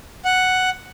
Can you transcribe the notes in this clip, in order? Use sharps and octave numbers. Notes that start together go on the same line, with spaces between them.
F#5